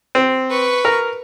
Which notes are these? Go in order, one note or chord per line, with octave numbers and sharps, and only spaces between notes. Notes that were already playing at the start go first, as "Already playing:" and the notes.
C4
B4 C#6
A#4